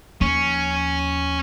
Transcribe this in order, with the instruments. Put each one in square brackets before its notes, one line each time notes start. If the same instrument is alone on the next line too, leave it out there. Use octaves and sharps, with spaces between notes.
[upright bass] D#2 F3 [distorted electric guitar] C#4